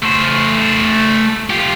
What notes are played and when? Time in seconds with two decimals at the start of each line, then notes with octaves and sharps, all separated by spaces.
0.03 A3 C5
1.50 F4 G4